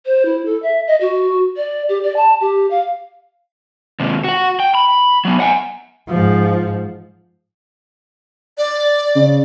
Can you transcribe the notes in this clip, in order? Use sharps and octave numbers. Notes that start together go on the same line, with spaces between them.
C5
E4
A4
E5
D#5
F#4
D5
G4
D5
A5
G4
F5
D#2 C3
F#4 F#5
G5
B5
F#3 B3
F#5 G#5
G#2 F3
D5
C#3